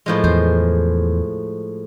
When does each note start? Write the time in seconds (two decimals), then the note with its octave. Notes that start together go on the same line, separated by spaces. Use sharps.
0.06 A2 F3 G#3
0.24 E2 C5